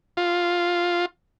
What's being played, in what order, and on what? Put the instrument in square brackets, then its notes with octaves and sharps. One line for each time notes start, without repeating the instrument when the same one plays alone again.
[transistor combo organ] F4